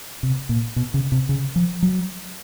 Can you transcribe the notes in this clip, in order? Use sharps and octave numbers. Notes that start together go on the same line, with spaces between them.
C3
A#2
B2
C#3
C3
C#3
F3
F#3